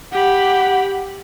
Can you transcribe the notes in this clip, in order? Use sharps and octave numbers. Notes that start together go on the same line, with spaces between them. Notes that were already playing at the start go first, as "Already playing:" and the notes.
G4 F#5 B5